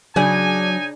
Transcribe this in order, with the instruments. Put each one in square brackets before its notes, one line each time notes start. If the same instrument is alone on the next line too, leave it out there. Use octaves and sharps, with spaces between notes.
[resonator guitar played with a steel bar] C#3 G#4 [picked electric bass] F#3 [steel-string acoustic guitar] D4 [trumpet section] D#4 G#5